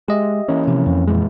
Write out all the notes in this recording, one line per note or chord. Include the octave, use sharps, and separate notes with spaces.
G#3 G4 D#5 E5
E3 A#3 C#4
C3 F3
F2
A#2 E3 G#3